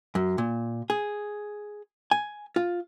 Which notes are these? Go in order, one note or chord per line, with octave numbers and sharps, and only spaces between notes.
F#2
A#2
G#4
G#5
F4